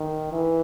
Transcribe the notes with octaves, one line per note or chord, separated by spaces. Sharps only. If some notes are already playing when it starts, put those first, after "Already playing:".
Already playing: D#3
E3